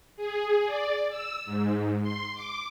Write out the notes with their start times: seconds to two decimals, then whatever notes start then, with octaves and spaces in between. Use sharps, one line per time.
0.17 G#4
0.66 D5
1.09 E6
1.45 G#2
2.02 C6
2.34 D6